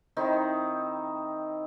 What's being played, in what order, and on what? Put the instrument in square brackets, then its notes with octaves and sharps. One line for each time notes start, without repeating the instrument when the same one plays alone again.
[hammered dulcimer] D#3 C4 D#4 E4